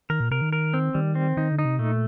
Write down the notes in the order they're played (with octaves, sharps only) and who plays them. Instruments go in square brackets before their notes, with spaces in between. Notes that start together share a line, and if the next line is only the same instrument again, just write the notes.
[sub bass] D#3 [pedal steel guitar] A#4
[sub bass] A#2
[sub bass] C3 [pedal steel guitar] A#4
[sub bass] D#3
[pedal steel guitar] A#4
C4
[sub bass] D#3 [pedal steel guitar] G3
[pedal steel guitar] C4
[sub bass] D#3 [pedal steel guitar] D#4
[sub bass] D3
[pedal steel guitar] D#4
[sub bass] C3
[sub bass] A#2 [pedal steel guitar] A3